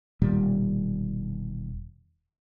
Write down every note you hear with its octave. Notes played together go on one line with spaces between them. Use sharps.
E1 A#2 D#3 G3